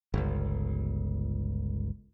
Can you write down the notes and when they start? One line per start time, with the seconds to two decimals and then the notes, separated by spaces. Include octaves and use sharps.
0.14 G1 C#2